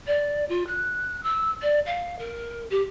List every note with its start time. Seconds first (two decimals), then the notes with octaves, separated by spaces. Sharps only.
0.07 D5
0.49 F4
0.67 F#6
1.23 E6
1.62 D5
1.86 F5
2.19 A#4
2.70 G4